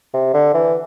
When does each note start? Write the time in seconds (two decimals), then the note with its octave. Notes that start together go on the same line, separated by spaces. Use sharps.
0.13 C3
0.34 D3
0.54 E3